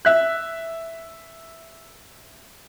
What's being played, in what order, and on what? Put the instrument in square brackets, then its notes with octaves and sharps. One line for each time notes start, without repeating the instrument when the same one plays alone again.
[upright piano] E5 F#6